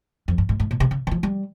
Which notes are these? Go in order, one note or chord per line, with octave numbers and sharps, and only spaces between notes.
F2
G2
G#2
G#2
A#2
C3
C#3
D#3
F3
G3